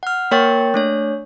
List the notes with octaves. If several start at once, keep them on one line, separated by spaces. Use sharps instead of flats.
F#5 F6
A#3 A#4 C#5 G5 C#6 A6
A3 D4 C#5